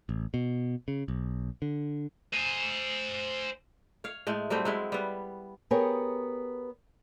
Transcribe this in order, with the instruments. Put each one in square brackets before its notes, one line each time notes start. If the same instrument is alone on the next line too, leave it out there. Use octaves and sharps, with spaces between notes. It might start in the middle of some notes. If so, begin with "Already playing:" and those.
[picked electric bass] A1
B2
C#3
B1
D3
[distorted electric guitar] C5 G#5
[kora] C#5 F5
A2 G#3 A3
F#3 G3 A3 C4
F#3 G#3 E4
G3 B3
[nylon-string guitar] B3 G4 G#4 A#4 C#5